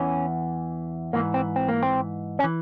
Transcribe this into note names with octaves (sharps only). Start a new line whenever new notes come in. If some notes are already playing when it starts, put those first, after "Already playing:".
Already playing: E2 E3 C#4
G#2 E3 A#3
C4
C4
A#3
C4
C#4
E3